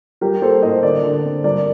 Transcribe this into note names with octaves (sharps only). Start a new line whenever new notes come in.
G3 G4 A#4
A#3 A4 C5
A2 C5 D#5
D3 A#4 D5
D3
C4
G2 A#4 D5